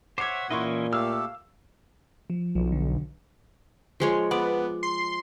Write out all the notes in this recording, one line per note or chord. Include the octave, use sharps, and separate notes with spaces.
C5 C#5 E5 F#5 D6 G#6
A#2 E3 C#4 E4 D#5 C6 C#6
A3 G4 A4 F5 E6 F6
F3
B1 F3
D3
F3 G#3 C#5
B3 D5
C6